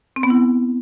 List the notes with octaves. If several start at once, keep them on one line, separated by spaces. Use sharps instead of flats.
C4
B3
E4